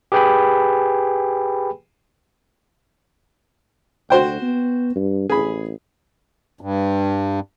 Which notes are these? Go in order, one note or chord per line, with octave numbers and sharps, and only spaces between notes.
G4 G#4 B4 G5 G#5 B5
D2 F#4 C5 G5
B3
G2
A1 G#4 B5
G2